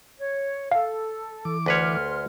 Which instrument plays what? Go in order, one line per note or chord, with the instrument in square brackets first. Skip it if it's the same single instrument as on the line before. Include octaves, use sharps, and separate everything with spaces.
[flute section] C#5
[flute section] A4 [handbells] F5
[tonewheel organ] E3 D6
[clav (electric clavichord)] D2 B4 C#5 [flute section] C6 F6